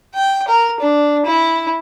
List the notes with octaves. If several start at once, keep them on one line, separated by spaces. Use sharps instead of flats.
G5
A#4
D4
E4